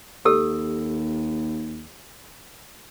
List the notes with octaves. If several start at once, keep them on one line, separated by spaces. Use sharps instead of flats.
D#2 G4 A4 E6